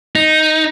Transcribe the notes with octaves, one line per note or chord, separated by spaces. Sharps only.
D#4